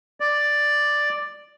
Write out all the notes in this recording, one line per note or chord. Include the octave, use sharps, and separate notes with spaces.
D5